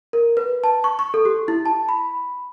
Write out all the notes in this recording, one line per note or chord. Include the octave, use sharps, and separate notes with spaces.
A#4
B4
A5
C#6
C#6
A4
G4
E4
A5
B5